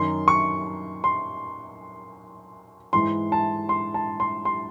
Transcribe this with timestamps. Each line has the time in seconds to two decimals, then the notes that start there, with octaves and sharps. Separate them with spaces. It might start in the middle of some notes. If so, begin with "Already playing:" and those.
Already playing: F#2 D#3 C6
0.28 C#6
1.04 C6
2.93 G#2 E3 C6
3.32 A5
3.69 C6
3.94 A5
4.20 C6
4.45 C6